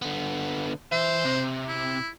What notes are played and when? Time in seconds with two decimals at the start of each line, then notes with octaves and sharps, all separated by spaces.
0.02 D3 B3
0.92 E3 C5 E5
1.25 C3
1.68 E4